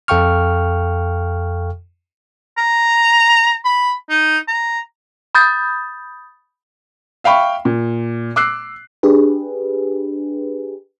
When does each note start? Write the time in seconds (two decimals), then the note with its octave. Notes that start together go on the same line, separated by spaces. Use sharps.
0.08 F2 A4 F5 G5 C#6 F6
2.58 A#5
3.65 B5
4.10 D#4
4.48 A#5
5.35 B5 D#6 G6 A6
7.24 E5 F5 G5 B5 C#6
7.65 A#2
8.36 D6 E6 F#6 C7
9.03 D4 G4 G#4 B4